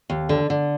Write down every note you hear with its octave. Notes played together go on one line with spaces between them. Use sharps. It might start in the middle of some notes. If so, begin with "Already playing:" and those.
D#2
D3
D3